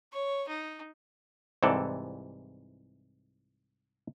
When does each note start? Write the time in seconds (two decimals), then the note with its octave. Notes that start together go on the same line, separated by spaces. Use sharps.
0.12 C#5
0.48 D#4
1.63 C2 G#2 C3 E3 A4 D5